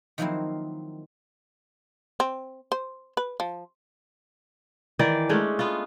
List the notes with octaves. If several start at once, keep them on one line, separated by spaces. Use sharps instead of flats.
D#3 F3 F#3 A#3 C4 E4
C4
C5
B4
F3
D#3 E3 D5
G#3 A3 C#4 D4
B3 F4